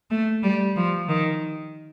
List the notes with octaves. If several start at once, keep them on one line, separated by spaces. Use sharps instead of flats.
A3
G3
F3
D#3